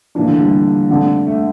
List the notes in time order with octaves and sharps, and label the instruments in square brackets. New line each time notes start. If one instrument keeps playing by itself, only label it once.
[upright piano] A#2 A3 D4 [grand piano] E3
[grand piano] D3
G3
[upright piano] F2 D3 A3
[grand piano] A3